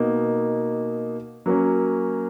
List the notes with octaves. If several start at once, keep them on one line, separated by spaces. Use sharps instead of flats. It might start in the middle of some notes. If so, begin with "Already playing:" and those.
Already playing: B2 A#3 D#4
F#3 A#3 C#4